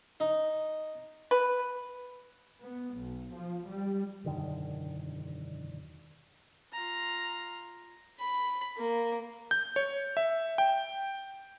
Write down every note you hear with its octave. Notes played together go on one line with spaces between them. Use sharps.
D#4
B4
B3
B1
F3
G3
E1 F#2 D3 D#3
F4 A#5
B5
A#3
G6
C#5
E5
G5